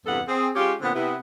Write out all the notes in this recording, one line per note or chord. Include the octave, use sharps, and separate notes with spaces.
E2 G2 C3 B3 A4 F#5
C4 G#4
G#3 C#4 F4 G4
A#2 D3 B3 C4
C3 B3 E4